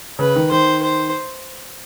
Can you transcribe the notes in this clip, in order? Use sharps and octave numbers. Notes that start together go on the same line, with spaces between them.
C#3 B4
D#3
D#3 C5
C5